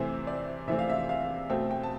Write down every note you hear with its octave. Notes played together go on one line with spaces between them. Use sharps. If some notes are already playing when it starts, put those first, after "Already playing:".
Already playing: C3 E3 A3 C4 C5
D5
C3 E3 A3 C4 E5
F5
E5
F5
B2 A3 C4 G5
G5
A5